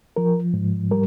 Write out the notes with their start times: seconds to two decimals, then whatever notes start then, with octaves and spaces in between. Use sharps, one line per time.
0.16 F3 A#4
0.54 G#2
0.91 G3 A#4